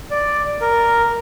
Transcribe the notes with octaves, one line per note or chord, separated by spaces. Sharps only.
D5
A#4